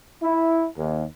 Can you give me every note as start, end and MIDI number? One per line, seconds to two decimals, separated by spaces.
0.22 0.67 64
0.78 1.04 39